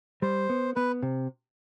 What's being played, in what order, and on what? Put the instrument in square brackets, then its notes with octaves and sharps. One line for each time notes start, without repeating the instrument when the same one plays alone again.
[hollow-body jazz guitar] G3 [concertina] C5
[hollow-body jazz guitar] B3
[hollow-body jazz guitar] B3 [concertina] B4
[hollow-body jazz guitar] C3